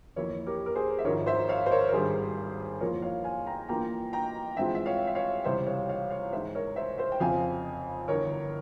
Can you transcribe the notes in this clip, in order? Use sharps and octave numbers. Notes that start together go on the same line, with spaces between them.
F2 E3 A#3 E4 A#4 C#5
G4 A#4
A#4
G#4 C5
E5
G#1 G#2 F3 A#4 C#5
C5 E5
C#5 F5
C5
A#4 C#5
A#4
G#1 G2 G3 G#4 C5
F2 E3 A#3 F4 A#4 C#5
C#5 F5
F5 G#5
G5 A#5
G2 E3 A#3 F4 G5 A#5
G5 A#5
G2 E3 G#3 C4 F4 E5 G5
E5
C#5 F5
E5
C#5 F5
C#2 C3 E3 G3 C5 E5
C#5 F5
C#5 F5
C#5 F5
G#2 E3 G#3 C5 E5
A#4 C#5
C5 E5
C5 E5
G5
F2 C#3 F3 C4 F5 G#5
G1 G2 E3 A#4 C#5